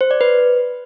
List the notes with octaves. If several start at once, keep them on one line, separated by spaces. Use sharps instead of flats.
C5
D5
B4